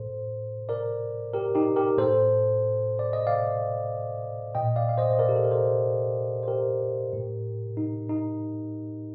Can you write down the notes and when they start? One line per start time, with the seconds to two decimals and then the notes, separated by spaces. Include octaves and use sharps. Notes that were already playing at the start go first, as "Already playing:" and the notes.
Already playing: A2 A4 C5
0.69 A#4 D5
1.33 G4 A#4
1.55 D#4 G4
1.76 G4 A#4
1.97 A2 A4 C5
2.99 D5
3.13 D#5
3.27 D5 F5
4.55 A#2 D#5 G5
4.76 D5 F5
4.89 F5
4.98 C5 D#5
5.13 D#5
5.19 A#4 D5
5.29 G4
5.36 A4
5.44 A#4
5.51 A4 C5
6.43 C5
6.48 G4 A#4
7.13 A2
7.77 D#4
8.09 D#4